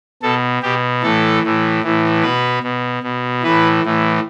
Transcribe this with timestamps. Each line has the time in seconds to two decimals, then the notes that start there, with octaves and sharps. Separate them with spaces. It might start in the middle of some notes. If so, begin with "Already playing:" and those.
0.22 B2 A4
0.62 B2 G4
1.03 A2 E3 A4
1.43 A2 E3
1.83 A2 E3
2.23 B2 B4
2.63 B2
3.03 B2
3.43 A2 E3 B4
3.84 A2 E3